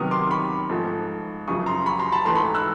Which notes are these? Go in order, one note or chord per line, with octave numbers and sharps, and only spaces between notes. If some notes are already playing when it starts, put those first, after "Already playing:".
Already playing: C3 D#3 F#3 B3 D#6 F6
C6 D6
B5 C#6
G#2 F3 A3
F#2 C#3 F3 C#6 D#6
A#5 C6
B5 C#6
A#5 C6
A5 B5
G#2 E3 A3 A#5 C6
B5 C#6
E6 F#6